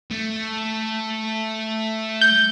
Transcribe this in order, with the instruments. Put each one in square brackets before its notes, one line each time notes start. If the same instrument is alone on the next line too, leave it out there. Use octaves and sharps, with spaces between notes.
[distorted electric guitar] A3
[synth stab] G6